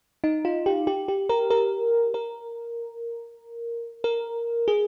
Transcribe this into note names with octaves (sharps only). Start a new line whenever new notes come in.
D#4
F4
G4
G4
G4
A#4
A#4
A#4
A#4
G#4